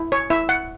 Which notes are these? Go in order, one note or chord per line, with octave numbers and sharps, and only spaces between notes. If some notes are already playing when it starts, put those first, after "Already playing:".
Already playing: E4
C#5
E4 E5
F#5